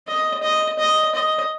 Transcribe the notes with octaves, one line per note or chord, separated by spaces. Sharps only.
D#5
D#5
D#5
D#5